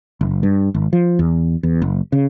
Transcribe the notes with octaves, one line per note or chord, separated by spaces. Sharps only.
F#1
G2
G#1
F3
E2
E2
F#1
C#3